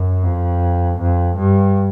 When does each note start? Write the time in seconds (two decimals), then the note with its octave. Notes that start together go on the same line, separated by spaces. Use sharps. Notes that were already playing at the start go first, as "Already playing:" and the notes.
Already playing: F#2
0.23 F2
0.99 F2
1.37 G2